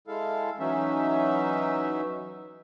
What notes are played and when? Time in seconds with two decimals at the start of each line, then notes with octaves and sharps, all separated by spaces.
0.07 G#3 E4 A4 F5
0.59 E3 F#3 C#4 D#4 E5